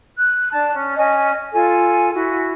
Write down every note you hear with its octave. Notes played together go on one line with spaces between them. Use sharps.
F#6
D4 A5
C#4
C#4 D#5 G#5
F4 A4 G#5
E4 F#4